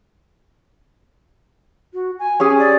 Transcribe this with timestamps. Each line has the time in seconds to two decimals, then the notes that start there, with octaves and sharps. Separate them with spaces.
1.94 F#4
2.19 G#5
2.40 C#4 G4 G#4
2.59 D5